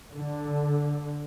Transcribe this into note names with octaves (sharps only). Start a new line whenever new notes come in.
D3